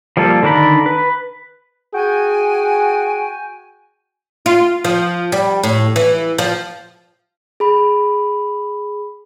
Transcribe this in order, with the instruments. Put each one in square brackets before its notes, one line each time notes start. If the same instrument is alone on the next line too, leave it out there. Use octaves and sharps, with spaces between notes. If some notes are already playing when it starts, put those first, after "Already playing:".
[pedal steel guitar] F3 G3 A#3 A4
D3 D#3 D4 A#4 B5
B4
[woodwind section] F#4 G5 G#5 [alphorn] G#4
[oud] F4
F3
G3
A2
E3
F3
[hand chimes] G#4 B5